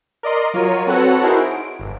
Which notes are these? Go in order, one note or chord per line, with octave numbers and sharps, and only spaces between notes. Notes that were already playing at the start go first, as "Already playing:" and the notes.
A#4 D5 D#5 C6
F#3 F4 A#4 C#5 D#7
C4 F#4 A4 B4 C#5 F#5
D#4 E4 F#4 G#4 A#4 C5
D7
G1